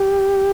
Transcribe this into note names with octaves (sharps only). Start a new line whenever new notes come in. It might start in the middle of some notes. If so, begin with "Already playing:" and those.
Already playing: G4